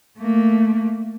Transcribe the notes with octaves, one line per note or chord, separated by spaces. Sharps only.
A3 A#3